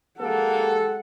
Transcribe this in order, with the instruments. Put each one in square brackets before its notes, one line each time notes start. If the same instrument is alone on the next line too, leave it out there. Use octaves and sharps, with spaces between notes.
[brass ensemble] G#3 G4 A4 [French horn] A#3 [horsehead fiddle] F#5